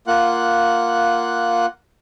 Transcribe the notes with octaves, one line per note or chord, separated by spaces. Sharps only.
A#3 F4 F#5 F#6